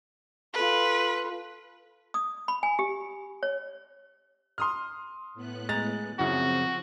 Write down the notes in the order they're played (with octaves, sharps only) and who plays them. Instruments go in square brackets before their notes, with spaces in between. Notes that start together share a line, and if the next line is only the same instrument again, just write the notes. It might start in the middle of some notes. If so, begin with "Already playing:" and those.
[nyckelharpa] F4 A4 [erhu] B4
[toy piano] D#6
B5
G#5
G4
C#5
[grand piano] C6 D#6 F6
[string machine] A2 B3 F#6
[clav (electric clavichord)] G#3 A#5 [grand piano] A6
[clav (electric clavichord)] F#2 C#3 [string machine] F3 C4 [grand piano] E4 [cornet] F#4